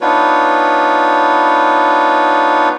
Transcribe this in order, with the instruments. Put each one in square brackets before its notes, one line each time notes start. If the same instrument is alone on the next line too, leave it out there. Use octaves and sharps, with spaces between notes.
[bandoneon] B3 D4 D#4 F4 B4 C#5